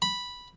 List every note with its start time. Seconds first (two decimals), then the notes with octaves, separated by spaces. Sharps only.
0.02 B5